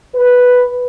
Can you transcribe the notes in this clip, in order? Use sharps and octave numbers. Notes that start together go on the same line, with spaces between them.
B4